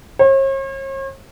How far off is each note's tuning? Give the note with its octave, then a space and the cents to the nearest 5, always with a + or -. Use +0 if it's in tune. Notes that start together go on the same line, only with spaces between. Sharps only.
C#5 -45